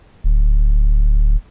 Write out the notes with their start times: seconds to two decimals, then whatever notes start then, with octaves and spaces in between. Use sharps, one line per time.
0.24 D1